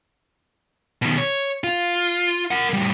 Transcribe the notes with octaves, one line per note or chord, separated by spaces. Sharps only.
B2 D#3
C#5
F4
A#4 F#5
A2 G3